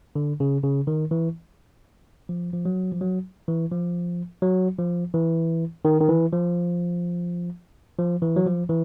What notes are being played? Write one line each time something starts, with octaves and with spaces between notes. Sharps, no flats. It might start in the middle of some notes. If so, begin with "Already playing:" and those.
D3
C#3
C#3
D#3
E3
F3
F3
F#3
F3
F#3
E3
F3
F#3
F3
E3
D#3
D#3
E3
F3
F3
E3
F#3
F3
E3